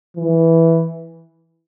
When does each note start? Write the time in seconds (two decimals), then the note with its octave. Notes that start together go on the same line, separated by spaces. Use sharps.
0.17 E3